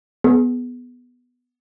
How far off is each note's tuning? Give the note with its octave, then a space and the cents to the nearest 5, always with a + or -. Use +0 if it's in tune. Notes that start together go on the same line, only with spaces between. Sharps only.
B3 +0 G#4 +15